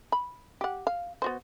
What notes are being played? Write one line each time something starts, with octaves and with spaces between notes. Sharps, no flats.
B5
G4 F#5
F5
B3 F#4 C5